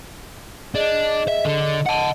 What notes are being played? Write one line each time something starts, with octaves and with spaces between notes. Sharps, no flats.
D4 G#4 D#5
E5
D3
D#5 F#5 A5